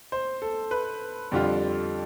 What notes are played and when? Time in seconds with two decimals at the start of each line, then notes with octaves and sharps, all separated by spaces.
0.12 C5
0.42 A4
0.71 B4
1.31 F2 D3 G3 D4 F4